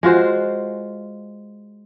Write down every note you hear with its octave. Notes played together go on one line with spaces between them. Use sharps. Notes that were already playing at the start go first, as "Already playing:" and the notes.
G#3 F4 F#4 C5